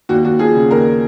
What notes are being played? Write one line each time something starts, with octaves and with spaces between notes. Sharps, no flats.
D#2 F#4
D#2 F#4
F3 G#4
C#3
D#2 A#4